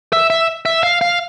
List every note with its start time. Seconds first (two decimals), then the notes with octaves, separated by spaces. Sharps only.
0.13 E5
0.30 E5
0.66 E5
0.83 F5
1.01 F5